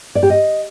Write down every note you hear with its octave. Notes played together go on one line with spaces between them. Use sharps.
D5
G4
D#5